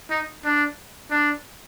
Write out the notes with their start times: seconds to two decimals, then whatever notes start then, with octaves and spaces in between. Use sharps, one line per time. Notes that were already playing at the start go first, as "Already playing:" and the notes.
0.10 D#4
0.44 D4
1.10 D4